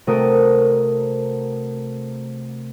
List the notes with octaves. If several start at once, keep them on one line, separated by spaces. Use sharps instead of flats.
C3 A3 F#4 A#4 D#6